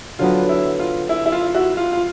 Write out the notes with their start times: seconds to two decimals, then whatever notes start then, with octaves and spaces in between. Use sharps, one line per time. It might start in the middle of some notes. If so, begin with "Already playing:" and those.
0.19 D3 F#3 B3 F4
0.49 E4
0.79 F4
1.09 E4
1.26 E4
1.32 F4
1.54 E4 F#4
1.77 F4
1.93 F4